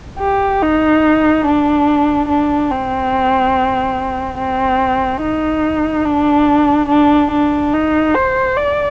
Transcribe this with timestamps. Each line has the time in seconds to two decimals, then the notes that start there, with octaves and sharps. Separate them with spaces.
0.19 G4
0.62 D#4
1.46 D4
2.29 D4
2.71 C4
4.38 C4
5.21 D#4
6.05 D4
6.89 D4
7.31 D4
7.73 D#4
8.14 C5
8.57 D5